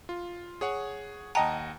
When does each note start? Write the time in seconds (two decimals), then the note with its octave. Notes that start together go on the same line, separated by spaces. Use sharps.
0.09 F4
0.61 G#4 C#5 F#5
1.35 D#2 D#5 F#5 G5 A5 A#5